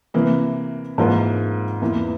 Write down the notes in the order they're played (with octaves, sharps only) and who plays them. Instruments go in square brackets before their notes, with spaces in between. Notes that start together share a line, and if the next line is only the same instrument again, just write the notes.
[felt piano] C3 E3 A#3
G#2 E3 A#3 F4 A#4
E2 E3 A#3